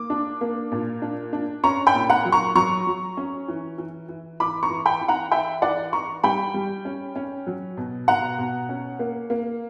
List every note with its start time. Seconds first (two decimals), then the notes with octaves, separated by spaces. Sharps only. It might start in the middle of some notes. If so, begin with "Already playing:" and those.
Already playing: A#3 D6
0.10 D4
0.41 A#3
0.72 A#2
1.02 D4
1.33 D4
1.64 C#4 A#5 C#6
1.87 G5 B5
1.94 A#2
2.10 F#5 A#5
2.25 F#3
2.32 A#5 C#6
2.55 F#3 A#5 C#6
2.87 F#3
3.17 C#4
3.48 E3
3.78 E3
4.09 E3
4.40 E3 B5 D6
4.63 A#5 C#6
4.70 E3
4.86 G5 B5
5.01 E3
5.08 F#5 A#5
5.31 E3 E5 G5
5.62 E3 D5 F#5
5.93 E3 A#5 C#6
6.24 G3 G5 B5
6.54 G3
6.85 C#4
7.16 C#4
7.47 F#3
7.77 B2
8.08 B2 F#5 A#5
8.38 B2
8.69 C#4
8.99 A#3
9.30 A#3